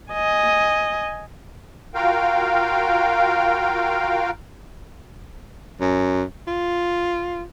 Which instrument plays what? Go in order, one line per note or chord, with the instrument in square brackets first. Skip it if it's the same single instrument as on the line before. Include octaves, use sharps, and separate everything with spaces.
[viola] D#5 G#5
[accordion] F4 F#4 A#4 F5 G5
[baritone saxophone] F#2
F4